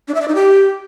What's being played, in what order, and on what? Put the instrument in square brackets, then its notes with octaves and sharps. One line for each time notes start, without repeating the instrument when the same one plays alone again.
[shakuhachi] D4
E5
D5
D#4
G4